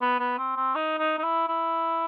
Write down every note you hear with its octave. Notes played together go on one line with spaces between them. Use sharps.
B3
B3
C4
C4
D#4
D#4
D#4
E4
E4